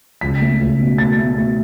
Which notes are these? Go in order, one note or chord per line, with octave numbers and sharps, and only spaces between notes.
C#2 B6
A3
C#2
B2
A3 A6
A3
A3